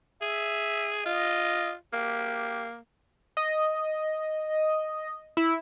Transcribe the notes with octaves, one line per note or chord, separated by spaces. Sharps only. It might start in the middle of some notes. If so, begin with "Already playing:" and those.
G#4 E5
F4 D#5
A#3 G4
D#5
E4